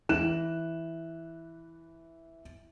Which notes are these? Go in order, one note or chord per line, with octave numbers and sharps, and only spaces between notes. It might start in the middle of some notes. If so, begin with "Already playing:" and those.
E3 F#6 E7